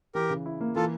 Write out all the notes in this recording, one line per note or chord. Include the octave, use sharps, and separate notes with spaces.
E3 G4 A#4
C#3
E4
A#3
E3 F4 A4